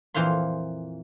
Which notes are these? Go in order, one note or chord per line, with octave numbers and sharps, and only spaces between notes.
F2 A#2 E3 C5 F5 C6